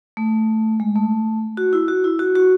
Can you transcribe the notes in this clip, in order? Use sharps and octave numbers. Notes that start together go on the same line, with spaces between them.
A3
G#3
A3
F#4
E4
F#4
E4
F#4
F#4